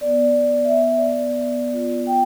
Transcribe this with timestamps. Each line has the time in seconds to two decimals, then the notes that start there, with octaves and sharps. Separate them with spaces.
0.01 B3 D5
0.22 B3
0.44 B3
0.65 B3 E5
0.86 B3
0.97 D5
1.09 B3
1.30 B3
1.51 B3
1.73 F4
1.93 B3
2.07 G5